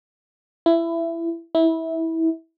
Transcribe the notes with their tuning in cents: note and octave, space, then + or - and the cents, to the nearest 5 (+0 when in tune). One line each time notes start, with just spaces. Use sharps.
E4 +20
E4 -20